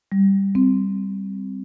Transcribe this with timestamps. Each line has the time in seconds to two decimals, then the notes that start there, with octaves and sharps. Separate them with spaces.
0.12 G3
0.55 C4